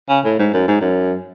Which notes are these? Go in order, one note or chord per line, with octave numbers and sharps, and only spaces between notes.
C#3
A2
G#2
F#2
G#2
F#2